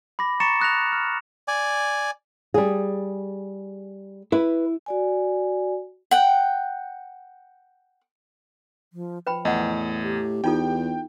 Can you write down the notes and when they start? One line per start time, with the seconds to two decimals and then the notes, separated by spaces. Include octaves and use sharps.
0.19 B5 D6 A#6
0.40 A#5 C#6 A6 A#6 C#7 E7
0.60 D#6 F#6 A#6 F7
0.92 F6
1.48 D5 G#5
2.54 G3 G#4
4.32 E4 B4
4.86 F#4 D5 G#5
6.11 F#5 G5
8.93 F3
9.27 F3 B4 G5 B5
9.45 E2 A2 D#5 F#5
10.02 G4
10.44 E2 D#4 F4 A4 G5